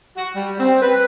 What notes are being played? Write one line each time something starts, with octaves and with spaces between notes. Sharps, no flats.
F#4
G3
C4
B4